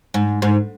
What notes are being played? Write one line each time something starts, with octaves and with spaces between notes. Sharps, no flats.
G#2
G#2